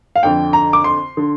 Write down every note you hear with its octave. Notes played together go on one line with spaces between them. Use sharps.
F5
F2 D3 G5
A#5
D6
C6
D3